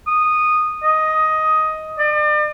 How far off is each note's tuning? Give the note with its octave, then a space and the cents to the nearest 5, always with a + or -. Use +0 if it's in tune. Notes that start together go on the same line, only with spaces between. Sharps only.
D#6 -10
D#5 +10
D5 +40